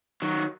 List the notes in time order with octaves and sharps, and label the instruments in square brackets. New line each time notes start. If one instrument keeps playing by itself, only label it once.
[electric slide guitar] D#3 F#3